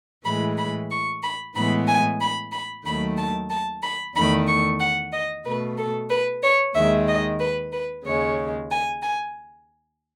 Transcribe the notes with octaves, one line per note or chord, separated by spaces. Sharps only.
A2 E3 G#3 B5
B5
C#6
B5
A2 E3 G#3 B3 B5
G#5
B5
B5
D#2 D#3 F#3 A3 B5
A5
A5
B5
E2 D#3 A3 B5
C#6
F#5
D#5
B2 A3 B4
A4
B4
C#5
D#2 D#3 G#3 E5
D#5
B4
B4
D#2 C#3 G#3 C#5
G#5
G#5